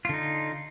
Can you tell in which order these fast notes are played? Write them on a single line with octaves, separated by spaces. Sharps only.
F4 D3 D#4